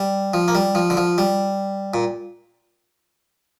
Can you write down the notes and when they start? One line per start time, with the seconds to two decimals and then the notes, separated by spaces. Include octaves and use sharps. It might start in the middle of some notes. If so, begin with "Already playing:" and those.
Already playing: G3
0.34 F3
0.48 A#3
0.55 G3
0.75 F3
0.90 D3
0.97 F3
1.18 G3
1.94 A#2